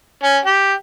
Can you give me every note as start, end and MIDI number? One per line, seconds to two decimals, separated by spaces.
0.23 0.38 61
0.45 0.73 67